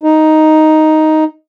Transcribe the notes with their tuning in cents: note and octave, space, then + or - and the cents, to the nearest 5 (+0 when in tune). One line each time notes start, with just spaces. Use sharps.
D#4 +5